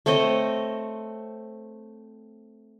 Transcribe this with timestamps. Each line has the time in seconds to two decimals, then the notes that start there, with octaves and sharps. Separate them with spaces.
0.06 A3 C4 C#5 D#5